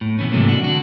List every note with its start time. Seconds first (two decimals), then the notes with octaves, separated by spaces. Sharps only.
0.01 A2
0.19 B2 E3 B3 C#4
0.32 G#2 C3 E3 F#3 A3 A#3
0.48 D4 F#4
0.64 D3 F#4